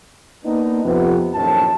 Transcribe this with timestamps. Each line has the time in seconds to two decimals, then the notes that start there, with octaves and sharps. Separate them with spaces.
0.44 A#3 B3 D4 D#4
0.84 F2 C3 B3
1.34 A#1 F#2 A2 C3 D#3 A5